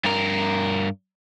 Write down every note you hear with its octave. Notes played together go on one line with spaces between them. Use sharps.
G2 A#4